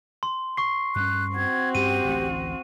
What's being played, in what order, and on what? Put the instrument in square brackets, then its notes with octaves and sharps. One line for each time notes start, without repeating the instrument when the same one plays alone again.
[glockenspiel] C6
C#6 C7
[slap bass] G2 C#4 [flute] F#6
[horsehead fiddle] C4 F#4 [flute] G#6
[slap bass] G2 C#4 [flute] G4 [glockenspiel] D#7
[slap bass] A1 D2 A3